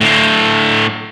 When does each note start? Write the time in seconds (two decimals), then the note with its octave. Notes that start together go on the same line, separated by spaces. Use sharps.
0.01 A2 D3